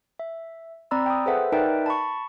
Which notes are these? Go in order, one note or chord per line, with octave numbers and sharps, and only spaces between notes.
E5
C4 D5 A#5 B5 E6
G5 D#6
G#4 A4 B4 C5 E5 F#5
D#4 A#4 B4 D5 E5 G5
A5 B5 C#6